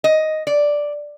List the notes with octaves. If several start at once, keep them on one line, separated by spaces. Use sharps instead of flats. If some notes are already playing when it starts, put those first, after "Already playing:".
D#5
D5